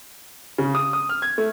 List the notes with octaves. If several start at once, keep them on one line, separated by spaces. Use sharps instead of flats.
C#3
D#6
D#6
F6
G#6
A3